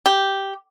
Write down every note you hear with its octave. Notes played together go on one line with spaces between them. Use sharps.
G4